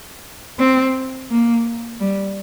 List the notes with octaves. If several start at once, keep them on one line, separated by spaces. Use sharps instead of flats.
C4
A#3
G3